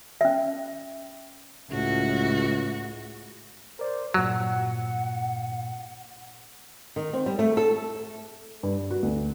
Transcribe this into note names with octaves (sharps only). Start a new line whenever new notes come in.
C#4 E5
C#2 A2 F#4
A#4 C5 D5
G2 A#2 F#3 F#5
D#3
C4
G3
A3
A4
G2
F#4
D2